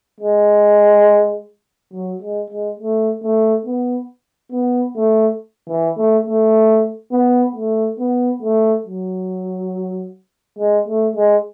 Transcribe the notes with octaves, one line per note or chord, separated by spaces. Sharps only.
G#3
F#3
G#3
G#3
A3
A3
B3
B3
A3
E3
A3
A3
B3
A3
B3
A3
F#3
G#3
A3
G#3